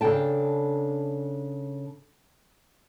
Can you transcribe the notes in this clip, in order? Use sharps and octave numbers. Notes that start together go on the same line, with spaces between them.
C#3 D4 A4 G5 A5